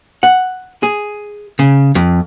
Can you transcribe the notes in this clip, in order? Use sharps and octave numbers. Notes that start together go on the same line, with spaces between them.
F#5
G#4
C#3
F2